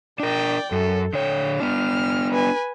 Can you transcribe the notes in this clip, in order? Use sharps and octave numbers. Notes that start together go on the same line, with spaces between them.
D4 A#4 D5 G5
F#2 A4
D3 C#5 G5
B3 D4 F6
B4 G#5